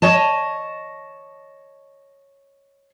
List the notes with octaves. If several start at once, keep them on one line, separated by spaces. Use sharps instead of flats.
C#5 D#5 A5